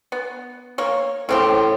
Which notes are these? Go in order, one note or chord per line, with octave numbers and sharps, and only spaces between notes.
B3
A#3 C#5
A2 C#3 C4 G4